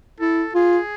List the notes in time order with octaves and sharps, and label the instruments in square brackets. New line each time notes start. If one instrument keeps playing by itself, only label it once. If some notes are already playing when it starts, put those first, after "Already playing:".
[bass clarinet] E4 [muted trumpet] A4
[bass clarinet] F4 [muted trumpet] G#4